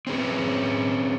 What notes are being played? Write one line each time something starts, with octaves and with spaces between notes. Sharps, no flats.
C4 C#4 G#4 B4